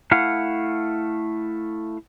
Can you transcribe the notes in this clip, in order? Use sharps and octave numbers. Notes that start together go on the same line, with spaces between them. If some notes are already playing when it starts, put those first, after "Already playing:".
A3 E4 F5 F#5